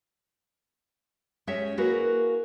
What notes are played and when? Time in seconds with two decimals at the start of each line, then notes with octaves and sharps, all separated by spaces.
1.47 G#3 C#4 G4 C#5 E5
1.77 A#3 E4 F#4 G#4 A#4 B4